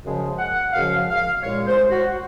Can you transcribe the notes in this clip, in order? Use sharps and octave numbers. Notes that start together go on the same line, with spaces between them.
F#2 C#3 F3 G#3
F#5
F#2 C#3 F3 G#3 F5
F5
C2 A#2 G#3 C#5
C5
F#4